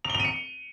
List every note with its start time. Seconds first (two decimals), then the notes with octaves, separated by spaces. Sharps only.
0.05 F7
0.10 G7
0.15 F7
0.20 D#7
0.25 C#7